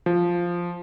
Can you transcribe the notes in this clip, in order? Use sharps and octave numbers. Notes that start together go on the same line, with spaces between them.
F3